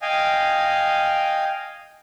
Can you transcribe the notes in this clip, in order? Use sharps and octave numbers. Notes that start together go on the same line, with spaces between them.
D#5 F5 G5 G#5